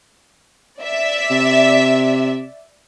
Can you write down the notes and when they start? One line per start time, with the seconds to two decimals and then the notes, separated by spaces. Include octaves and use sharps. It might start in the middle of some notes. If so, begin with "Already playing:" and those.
0.81 D5 E5
1.31 C3